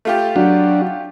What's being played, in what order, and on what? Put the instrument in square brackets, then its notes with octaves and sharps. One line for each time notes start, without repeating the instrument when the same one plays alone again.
[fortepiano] A3 F4 G4
[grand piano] F#3 [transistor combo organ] D4 F#4